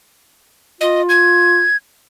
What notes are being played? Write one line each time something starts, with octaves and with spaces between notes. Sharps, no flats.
F4 D#5
G#6